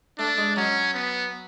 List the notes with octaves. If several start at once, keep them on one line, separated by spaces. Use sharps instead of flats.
A3 D4
G#3
F#3 C#4
B3